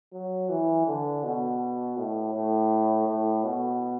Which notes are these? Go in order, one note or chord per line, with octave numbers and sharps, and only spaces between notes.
F#3
E3
D3
B2
A2
A2
A2
B2